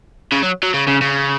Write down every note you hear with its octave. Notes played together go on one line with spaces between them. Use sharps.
C#3
F#3
F#3
C#3
C#3
C#3